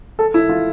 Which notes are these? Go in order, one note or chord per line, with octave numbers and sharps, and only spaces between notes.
A4
E4
F4